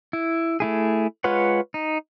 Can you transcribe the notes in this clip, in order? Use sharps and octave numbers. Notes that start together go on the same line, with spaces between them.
E4
A3 E4 G#4
G#3 F4 B4 C#5 F#5
D#4